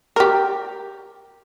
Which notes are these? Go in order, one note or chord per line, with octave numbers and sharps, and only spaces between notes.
G4 A#4